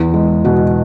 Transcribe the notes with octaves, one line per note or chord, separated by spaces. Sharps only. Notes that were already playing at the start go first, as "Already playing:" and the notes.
Already playing: E2
G#3
B2 F#4